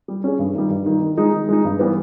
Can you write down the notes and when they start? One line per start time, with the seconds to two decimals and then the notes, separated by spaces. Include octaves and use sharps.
0.08 G3
0.24 C#4 G#4
0.39 G2
0.55 D#3 G3
0.70 G2
0.86 D#3 G3
1.02 D#3
1.17 G#3 D#4
1.32 D#3
1.49 G#3 D#4
1.65 G2
1.79 E3 G3 B3